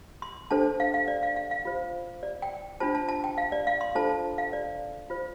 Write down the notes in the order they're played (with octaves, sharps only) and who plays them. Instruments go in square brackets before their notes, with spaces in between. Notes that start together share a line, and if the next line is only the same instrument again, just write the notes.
[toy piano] C6
D4 A4 C5 A5
F5
F5
D5
F5
F5
F5
F4 C5
D5
G5
D4 F4 C5 A5
A5
A5
G5
F5
D5
F5
C6
D4 F4 A4 C5 A5
A5
F5
D5
F4 C5